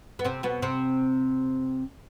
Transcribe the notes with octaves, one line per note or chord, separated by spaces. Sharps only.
B3
C3 C4
B2 B3
C3 C4